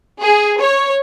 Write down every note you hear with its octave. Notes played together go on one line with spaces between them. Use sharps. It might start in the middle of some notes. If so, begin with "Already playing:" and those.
G#4
C#5